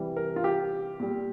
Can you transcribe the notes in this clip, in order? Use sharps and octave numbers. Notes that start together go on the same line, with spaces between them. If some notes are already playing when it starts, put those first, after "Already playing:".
Already playing: C3 E3 G3
A#4
F4
G4
A#2 G3